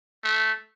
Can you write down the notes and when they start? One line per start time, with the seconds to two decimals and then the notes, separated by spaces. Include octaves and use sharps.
0.24 A3